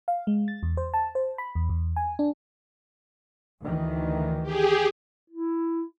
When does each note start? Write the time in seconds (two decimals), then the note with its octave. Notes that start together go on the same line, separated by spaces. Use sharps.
0.08 F5
0.27 G#3
0.48 A6
0.63 E2
0.77 C5
0.94 A5
1.15 C5
1.38 B5
1.55 E2
1.69 E2
1.96 G#5
2.19 D4
3.62 D2 D#3 E3
4.43 G4 G#4
5.30 E4